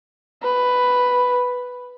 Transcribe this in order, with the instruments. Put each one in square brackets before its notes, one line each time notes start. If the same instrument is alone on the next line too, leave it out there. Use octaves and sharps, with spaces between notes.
[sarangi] B4